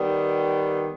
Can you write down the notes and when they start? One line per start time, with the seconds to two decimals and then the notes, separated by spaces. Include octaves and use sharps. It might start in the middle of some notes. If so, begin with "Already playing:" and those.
Already playing: D#3 G3 B3